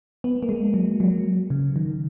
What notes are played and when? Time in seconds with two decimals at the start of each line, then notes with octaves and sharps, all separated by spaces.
0.24 B3
0.43 A#3
0.49 G#3
0.74 F#3
1.00 F#3
1.50 C#3
1.76 D#3